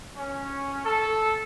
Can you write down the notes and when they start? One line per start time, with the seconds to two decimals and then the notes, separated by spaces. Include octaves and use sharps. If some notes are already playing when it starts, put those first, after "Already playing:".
0.17 C#4
0.84 A4